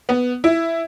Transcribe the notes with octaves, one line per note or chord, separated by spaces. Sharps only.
B3
E4